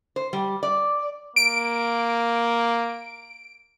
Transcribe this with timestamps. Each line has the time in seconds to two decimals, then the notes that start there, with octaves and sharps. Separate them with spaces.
0.16 C5
0.33 G3
0.63 D5
1.36 A#3 D7